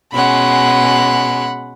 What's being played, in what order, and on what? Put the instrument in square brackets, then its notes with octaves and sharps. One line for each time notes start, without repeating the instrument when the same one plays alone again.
[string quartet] B2 G#3 C#4 [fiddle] F#5 B5